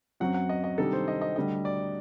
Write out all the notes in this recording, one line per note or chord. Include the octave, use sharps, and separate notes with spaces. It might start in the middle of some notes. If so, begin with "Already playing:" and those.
F#2 F#3 C4 F#4 F#5
F#5
D#5
D#5
C3 D#3 G3 D4 G4 A4
C5
D#5
D#5
D2 D3 G3 D4 A4 D#5
D5